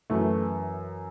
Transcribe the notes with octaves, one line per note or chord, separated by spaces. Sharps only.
F#2 E3 A3